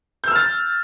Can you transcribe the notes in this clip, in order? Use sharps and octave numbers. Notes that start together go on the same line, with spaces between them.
E6 F6 G6 A6